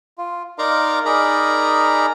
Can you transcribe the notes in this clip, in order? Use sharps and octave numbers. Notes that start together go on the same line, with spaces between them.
F4
D#4 A#4 D5 F5 A#5 C6
D#4 G#4 A#4 D5 A#5 B5